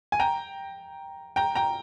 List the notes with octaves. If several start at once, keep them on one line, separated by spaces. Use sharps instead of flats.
G#5
G5 A#5
G5 A#5
G5 A#5